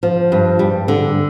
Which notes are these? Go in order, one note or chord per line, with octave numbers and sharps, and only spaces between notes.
F3
G2
G3
D3